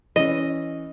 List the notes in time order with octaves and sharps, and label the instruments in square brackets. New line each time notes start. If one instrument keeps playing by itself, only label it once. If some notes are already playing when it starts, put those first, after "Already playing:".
[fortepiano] E3 C#4 [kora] D#5